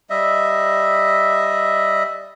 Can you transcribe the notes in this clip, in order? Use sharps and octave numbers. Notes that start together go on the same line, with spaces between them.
G3 D#5 E5